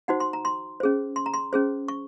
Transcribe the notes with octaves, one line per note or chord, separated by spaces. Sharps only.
D#4 F#4 C5 F#5
C6
A#5
C6
C#4 G#4 C5
C6
A#5
C6
C#4 G#4 C5
C#6